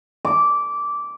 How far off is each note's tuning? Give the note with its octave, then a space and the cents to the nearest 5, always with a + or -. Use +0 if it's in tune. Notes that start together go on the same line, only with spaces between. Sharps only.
D6 -15